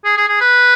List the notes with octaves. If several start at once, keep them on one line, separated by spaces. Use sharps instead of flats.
G#4
G#4
G#4
B4